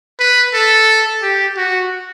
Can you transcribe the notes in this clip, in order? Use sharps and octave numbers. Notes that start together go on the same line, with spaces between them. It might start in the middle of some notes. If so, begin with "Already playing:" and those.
B4
A4
G4
F#4